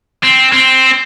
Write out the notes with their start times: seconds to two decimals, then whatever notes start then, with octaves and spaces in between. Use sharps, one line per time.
0.23 C4
0.53 C4